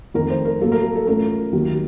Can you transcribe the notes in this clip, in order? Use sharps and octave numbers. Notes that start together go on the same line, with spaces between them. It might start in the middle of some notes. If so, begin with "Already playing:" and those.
F2 D#3 A3 A#4
C5
A#4
A1 A2 F#3 A#3 A4
A#4
A4
A4
A1 A2 A3 C#4 F4 A#4
D#2 D#3 F#3